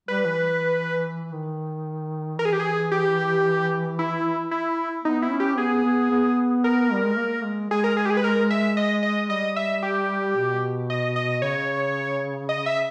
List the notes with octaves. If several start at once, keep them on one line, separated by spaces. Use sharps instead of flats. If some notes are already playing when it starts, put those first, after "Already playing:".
G3 B4
E3
D#3
E3 A#4
G#4
G4
G#4
G4
E4
E4
B3 D#4
E4
C#4
G4
B3 G#4
B3
B3
A#4
G3
G#3
A#3
G#3
G#3 G#4
A#4
G#4
G4
G#4
B4
A#4
E5
D#5
D#5
G3 D#5
E5
G4
B2
D#5
D#5
C#3 C#5
D#5
E5